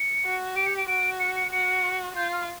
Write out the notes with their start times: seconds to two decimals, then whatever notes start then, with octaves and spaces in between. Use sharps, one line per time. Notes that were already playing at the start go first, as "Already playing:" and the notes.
Already playing: C#7
0.25 F#4
0.56 G4 D7
0.66 C#7
0.78 D7
0.88 F#4 D7
1.20 C#7
1.36 C#7
1.52 F#4 C#7
2.16 F4 G6
2.32 F6